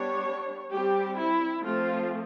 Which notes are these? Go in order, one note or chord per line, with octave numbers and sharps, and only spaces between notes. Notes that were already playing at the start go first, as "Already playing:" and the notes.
Already playing: G3 B3 D4 C#5
G3 C4 G4
E4
F3 A3 C4 F4